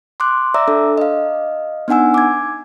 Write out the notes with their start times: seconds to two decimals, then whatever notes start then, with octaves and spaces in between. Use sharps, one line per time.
0.20 C6 D6 F#6
0.54 D5 E5 A#5 D6 E6
0.68 D4 A4
0.98 D#5 F5
1.88 B3 D4 D#4 F#5 G#5 E6
2.14 D6 G#6